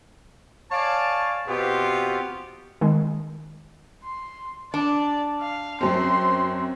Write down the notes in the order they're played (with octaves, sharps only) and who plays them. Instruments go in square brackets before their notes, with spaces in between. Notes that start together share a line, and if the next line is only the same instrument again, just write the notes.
[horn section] C#5 D5 F5 G#5 A5
B2 B3 C4 F4 G4
[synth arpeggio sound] D#3 G#3
[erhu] C6
[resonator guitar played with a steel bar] D4 [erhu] D5
[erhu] F5
[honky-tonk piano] F#2 C4 [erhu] C6